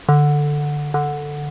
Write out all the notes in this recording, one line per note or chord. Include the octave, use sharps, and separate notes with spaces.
D3
D3